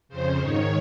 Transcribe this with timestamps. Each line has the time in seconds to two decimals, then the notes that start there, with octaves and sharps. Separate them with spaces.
0.09 F2 C#3 C5
0.39 G#2 D#3 C#5